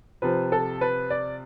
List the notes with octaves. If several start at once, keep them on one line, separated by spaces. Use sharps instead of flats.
C3 F3 B4
A4
B4
D5